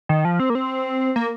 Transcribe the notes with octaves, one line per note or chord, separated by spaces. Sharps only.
D#3
F3
C4
A#3
C4
A#3